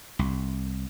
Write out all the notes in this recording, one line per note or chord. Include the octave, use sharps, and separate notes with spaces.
C2